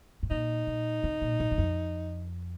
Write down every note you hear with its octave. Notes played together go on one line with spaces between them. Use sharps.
A2
A#2 D#4
A#2
C3
A#2
A2
G2
F2